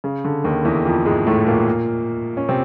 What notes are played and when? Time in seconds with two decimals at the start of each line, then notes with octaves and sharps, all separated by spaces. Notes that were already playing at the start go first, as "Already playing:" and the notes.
0.04 C#3
0.25 D3
0.44 D#2 D#3
0.65 E2 E3
0.85 F2 F3
1.05 G#2 G#3
1.27 A2 A3
1.47 A#2 A#3
2.37 C#4
2.49 C3 C4